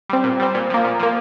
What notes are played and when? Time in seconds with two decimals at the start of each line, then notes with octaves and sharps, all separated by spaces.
0.09 G3 C4
0.24 A#2
0.40 G3 C4
0.55 A#2
0.70 F3 A#3
0.85 A#2
1.00 F3 A#3